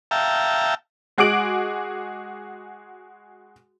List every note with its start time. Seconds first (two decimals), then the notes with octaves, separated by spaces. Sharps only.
0.11 E5 F5 G5 A5 A#5
1.18 G#3 F#4 G#4 D6 D7 F#7